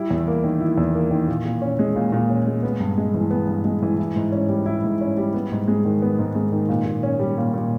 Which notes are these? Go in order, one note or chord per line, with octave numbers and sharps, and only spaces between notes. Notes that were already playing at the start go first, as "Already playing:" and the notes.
Already playing: G3 E4
E2
A#3
D#3
E4
E2
A#3
D#3
A#2
A#2
C#4
G#3
A#2
A#2
C#4
G#3
B3
G2
G#3
E3
B3
G2
G#3
E3
E4
G#2
C#4
G3
E4
G#2
C#4
G3
B3
G#2
G#3
D#3
B3
G#2
G#3
D#3
A#2
A#2
C#4
G3
A#2
A#2